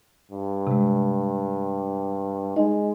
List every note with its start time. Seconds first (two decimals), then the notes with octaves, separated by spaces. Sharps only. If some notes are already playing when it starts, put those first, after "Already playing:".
0.31 G2
0.67 C3 G#3
2.56 G#3 D#4 D#5